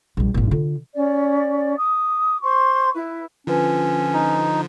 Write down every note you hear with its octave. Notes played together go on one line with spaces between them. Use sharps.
A#1 G3
G#1 A#2
D3 F4
C#4 D5
D6 D#6
C5 C6 C#6
E4 B4
D3 F3 C#4 F4 B4
D#4